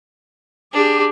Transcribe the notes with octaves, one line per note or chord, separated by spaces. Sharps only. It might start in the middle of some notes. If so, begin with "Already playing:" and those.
D4 G4 G#4